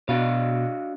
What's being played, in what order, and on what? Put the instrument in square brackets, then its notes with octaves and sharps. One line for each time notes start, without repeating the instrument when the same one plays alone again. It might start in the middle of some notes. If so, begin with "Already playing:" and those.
[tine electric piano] B2 [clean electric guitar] D4 F#4 F5